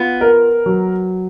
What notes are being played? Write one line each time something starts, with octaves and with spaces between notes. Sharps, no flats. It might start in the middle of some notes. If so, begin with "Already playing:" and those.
Already playing: B3 F4
A#4
F#3